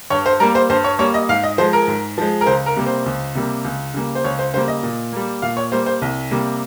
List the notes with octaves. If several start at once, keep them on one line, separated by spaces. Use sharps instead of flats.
G2 C#5
C5
G3 A#3 A#4
C5
G2 C5
C#5
G3 A#3 C#5
D#5
G#2 F5
D#5
F3 G#3 C5
A#4
G#2
F3 G#3
A#4
C#2 C5
A#4
C3 G3 A#3
C5
C#2
C3 G3 A#3
C#2
C#3 G3 A#3
C5
C#2 C#5
C5
C#3 G3 A#3 C5
D#5
A#2
G3 A#3
A#2 F5
C#5
G3 A#3 C5
C5
C2
C3 G3 A#3